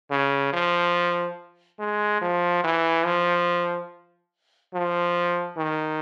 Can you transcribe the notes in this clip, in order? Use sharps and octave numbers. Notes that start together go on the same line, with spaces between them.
C#3
F3
G#3
F3
E3
F3
F3
D#3